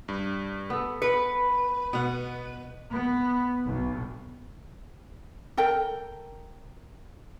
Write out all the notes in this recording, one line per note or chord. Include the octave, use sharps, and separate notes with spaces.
G2
B3 A4
B4 C#7
B2 B3 F#5
B3
B1
A4 A#4 G5